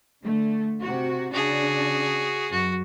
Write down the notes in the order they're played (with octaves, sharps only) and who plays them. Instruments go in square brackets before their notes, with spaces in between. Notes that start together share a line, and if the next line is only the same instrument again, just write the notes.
[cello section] D3 A3
C3 F#4
[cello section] C#3 D4 [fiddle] F#4 G#4
[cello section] F#2 [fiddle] F#4